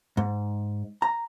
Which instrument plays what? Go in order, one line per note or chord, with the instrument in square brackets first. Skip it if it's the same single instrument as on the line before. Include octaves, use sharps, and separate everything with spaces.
[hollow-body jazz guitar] G#2
A#5